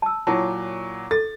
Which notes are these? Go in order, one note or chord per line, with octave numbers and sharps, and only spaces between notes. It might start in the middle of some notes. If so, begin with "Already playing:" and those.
A5 E6
A#2 F#3 E4 C#5 A5
A4 A6